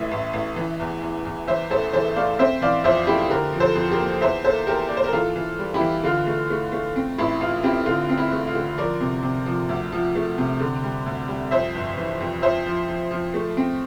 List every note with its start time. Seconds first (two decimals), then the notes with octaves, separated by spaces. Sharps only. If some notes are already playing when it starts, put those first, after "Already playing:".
Already playing: A1 A2 E5
0.11 A1
0.33 A1
0.56 E3
0.80 E2
1.02 E2
1.25 E2
1.47 E3 C5 E5
1.70 A1 A4 C5
1.93 E3 A4 C5
2.16 A3 D5 F5
2.39 C4 C5 E5
2.61 E3 D5 F5
2.84 F2 C5 E5
3.07 A3 E4 G4
3.30 D3 G4 A#4
3.53 F3
3.60 A4 C5
3.75 F2
3.91 G4 A#4
3.99 A#3
4.21 E2 C5 E5
4.45 A#3 A4 C5
4.67 E2 G4 A#4
4.88 A#3 D5
4.97 C5
5.04 A#4
5.13 E3 F4 A4
5.36 E3
5.59 G3
5.74 E4 G4
5.81 E3
6.03 D3 F4
6.27 A3
6.50 A3
6.72 A3
6.96 C4
7.18 A1 E4
7.41 A1 F4
7.63 C4 E4 G4
7.86 D3 F4
8.10 C4
8.18 E4
8.32 A3
8.47 F4
8.55 D3
8.77 F3 A#4 D5
9.01 C3
9.23 C3
9.46 F3
9.69 D2
9.92 F3
10.15 A3
10.38 C3
10.60 D3
10.84 G3
11.06 D2
11.28 G3
11.51 F2 C5 E5
11.75 G1
11.98 E3
12.20 F2
12.42 F3 C5 E5
12.66 F3
12.89 F3
13.11 F3
13.34 A3
13.57 C4